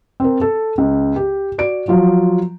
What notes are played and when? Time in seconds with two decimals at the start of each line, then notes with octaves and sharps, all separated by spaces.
0.20 C4 A#4
0.41 A4
0.78 C#2
1.16 G4
1.58 F#4 D5 D7
1.88 F3 F#3 F4